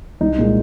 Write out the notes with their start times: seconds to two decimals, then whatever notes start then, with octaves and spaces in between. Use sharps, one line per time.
0.21 C2 D#4
0.38 A#2 G#3